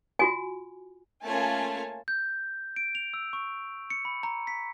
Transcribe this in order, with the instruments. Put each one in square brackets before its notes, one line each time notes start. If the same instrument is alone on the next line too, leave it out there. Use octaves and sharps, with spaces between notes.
[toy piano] F4 F#4 G#5
[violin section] A3 A#3 C#4 F4 G#5 A5
[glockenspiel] G6
D7
F7
E6
C#6
C#7
B5
A#5
B6